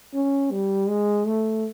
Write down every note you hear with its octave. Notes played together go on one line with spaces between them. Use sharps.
C#4
G3
G#3
A3